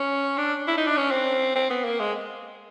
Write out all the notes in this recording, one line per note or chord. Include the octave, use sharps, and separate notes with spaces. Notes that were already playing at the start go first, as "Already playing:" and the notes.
Already playing: C#4
D4
E4
D#4
D4
C#4
C4
C4
B3
A#3
G#3